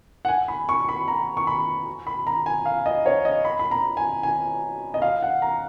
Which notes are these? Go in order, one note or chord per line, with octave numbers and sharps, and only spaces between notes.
F#5
G#5
B5
C#6
B5
A#5
C#6
B5
B5
A#5
G#5
F5
D#5
C#5
D#5
B5
B5
A#5
G#5
G#5
D#5
F5
F#5
A#5